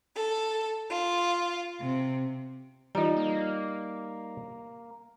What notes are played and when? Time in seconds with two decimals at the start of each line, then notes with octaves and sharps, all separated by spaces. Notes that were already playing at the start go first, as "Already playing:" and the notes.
0.15 A4
0.89 F4
1.79 C3
2.95 E3 G3 D#4 F4 A#5
3.17 A#3